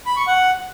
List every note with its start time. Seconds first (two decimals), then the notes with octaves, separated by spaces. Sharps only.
0.06 B5
0.16 C#6
0.27 F#5